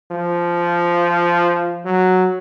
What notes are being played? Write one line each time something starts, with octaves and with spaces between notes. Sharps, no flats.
F3
F#3